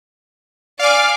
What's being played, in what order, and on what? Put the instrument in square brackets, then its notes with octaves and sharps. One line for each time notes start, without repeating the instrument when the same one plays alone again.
[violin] D5 G#5 [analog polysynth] F5 D6